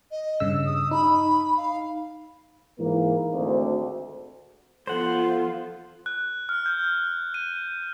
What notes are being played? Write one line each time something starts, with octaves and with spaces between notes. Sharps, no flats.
D#5
G2 C#3 E6
D#6
D#4 B5
F5
G#2 E3 A#3
G#1 D2
F3 B3 F4 A4 C5 F#5
F#6
F6
G6
D#7